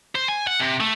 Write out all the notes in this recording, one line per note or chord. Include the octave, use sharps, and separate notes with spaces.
C5
G#5
F#5
C3
A3